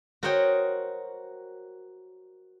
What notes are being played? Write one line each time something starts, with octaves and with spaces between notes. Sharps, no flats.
F#4 A#4 C5 C#5 D#5 G5